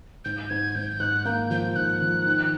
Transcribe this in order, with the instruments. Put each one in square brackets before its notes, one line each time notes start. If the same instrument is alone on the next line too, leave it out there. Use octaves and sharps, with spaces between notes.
[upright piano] G#2 [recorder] G6
[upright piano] G#2 [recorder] G#6
[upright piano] G#2 [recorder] G6
[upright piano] G#2 [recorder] F#6
[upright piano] A#3 [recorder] G6
[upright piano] F3 [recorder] G6
[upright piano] G#2 [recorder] F#6
[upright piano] F3
D#3